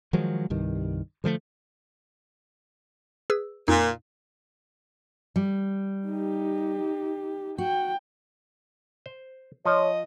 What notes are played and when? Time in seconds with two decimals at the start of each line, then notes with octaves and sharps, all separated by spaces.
0.13 D#3 F3 F#3 G#3
0.50 C2 G2 D#3
1.24 D3 F3 G#3 A3
3.30 G#4 B4 E6
3.68 F2 A#2 D#4
5.36 G3
6.07 D#4 G4
7.58 F#4 G5
9.06 C5
9.65 F3 C#5 D#5